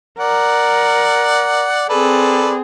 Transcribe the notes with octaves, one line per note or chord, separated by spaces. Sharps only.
A#4 D5 F#5
C4 G#4 A4 B4 D5